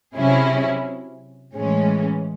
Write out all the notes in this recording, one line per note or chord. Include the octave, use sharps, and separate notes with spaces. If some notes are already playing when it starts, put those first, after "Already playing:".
C3 F#3 C#4 E4 G#4
A2 E3 G#3 C#4